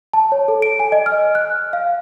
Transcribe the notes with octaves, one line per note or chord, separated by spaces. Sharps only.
A5
C#5
A4
D7
G#5
D#5
F6
F#6
F5